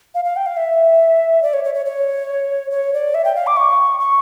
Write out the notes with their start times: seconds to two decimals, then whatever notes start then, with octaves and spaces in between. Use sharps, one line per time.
0.15 F5
0.25 F5
0.36 G5
0.46 F5
0.57 E5
1.43 D5
1.54 C#5
1.64 C#5
1.75 C#5
1.86 C#5
2.71 C#5
2.93 D5
3.15 E5
3.25 G5
3.35 F5
3.47 D6
3.57 C#6
4.00 C#6